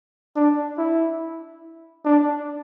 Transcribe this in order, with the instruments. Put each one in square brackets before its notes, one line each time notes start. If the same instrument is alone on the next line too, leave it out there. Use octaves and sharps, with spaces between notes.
[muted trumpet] D4
E4
D4